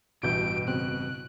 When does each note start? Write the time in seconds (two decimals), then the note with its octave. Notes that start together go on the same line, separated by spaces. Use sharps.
0.23 A1 G2 B2 E3 G6 D7
0.68 C#3 B3 C4 F#6